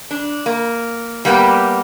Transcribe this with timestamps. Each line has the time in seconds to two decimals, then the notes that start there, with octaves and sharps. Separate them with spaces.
0.11 D4
0.46 A#3
1.25 G3 A#3 B3 G4